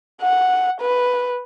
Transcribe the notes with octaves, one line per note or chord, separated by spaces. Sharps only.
F#5
B4